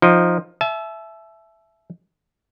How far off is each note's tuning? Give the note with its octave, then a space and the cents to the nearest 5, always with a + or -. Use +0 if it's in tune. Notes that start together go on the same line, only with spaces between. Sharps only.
F3 +5 D#4 +5 G5 -15
E5 +10 A5 -40